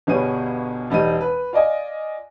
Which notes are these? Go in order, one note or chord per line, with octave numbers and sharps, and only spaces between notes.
G1 B2 G3 G#4 C#5 D#7
E1 G3 D#4 D#7
B4
F4 D5 D#5 G#5